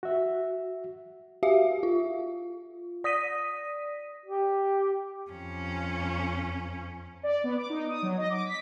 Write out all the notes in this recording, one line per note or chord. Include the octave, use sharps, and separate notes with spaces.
F#4 E5
F#4 G4 E5 F5
F4
D5 D#6 A#6 B6 D#7
G4
F2 C#4
D5
B3
D6
D#4
D#6
F#3
D#5
D6
B6